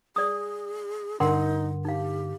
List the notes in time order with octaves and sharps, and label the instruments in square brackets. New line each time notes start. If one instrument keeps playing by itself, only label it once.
[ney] G#4 [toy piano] D5 D#6
[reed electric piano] G2 D3 [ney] D#4 [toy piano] A#4 F#5 C6
[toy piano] D#4 F5 [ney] G4